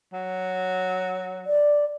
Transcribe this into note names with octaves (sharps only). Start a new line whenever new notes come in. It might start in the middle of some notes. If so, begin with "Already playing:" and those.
F#3
D5